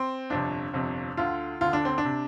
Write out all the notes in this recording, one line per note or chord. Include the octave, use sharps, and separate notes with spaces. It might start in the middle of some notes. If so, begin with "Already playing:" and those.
Already playing: C4
G1 F2 C3 D4
G1 F2 C3
D2 D3 F4
D2 D3 F4
D4
C4
D4
C3